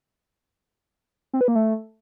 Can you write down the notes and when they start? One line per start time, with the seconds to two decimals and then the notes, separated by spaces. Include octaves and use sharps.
1.33 C4
1.41 B4
1.48 A#3
1.55 A3